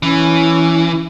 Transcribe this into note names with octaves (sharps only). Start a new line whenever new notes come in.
E3 C#4